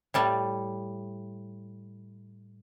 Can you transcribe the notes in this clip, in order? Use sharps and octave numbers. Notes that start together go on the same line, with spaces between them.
A2 G3 A5